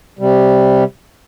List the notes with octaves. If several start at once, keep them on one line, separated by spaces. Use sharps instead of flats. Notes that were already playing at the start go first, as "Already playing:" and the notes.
C3 G3